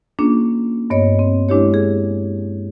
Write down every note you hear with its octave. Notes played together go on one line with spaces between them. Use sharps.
A#3 C#4 D4 F4 G#4
G2 B3 C#5 D#5
C4
G#3 D4 E4 G4 C#5
G#4